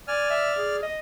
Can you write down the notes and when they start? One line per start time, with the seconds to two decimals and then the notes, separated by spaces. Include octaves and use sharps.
0.08 D5 G#5 F6
0.30 E5
0.58 G#4
0.83 D#5